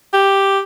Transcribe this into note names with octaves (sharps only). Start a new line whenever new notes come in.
G4